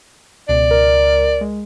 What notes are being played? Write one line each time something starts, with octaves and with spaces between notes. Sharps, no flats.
C#2 B2 D5
C#2 A#4
G#3